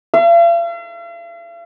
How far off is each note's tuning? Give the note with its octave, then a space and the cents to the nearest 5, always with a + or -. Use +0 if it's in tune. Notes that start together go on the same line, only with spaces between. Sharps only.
F5 -45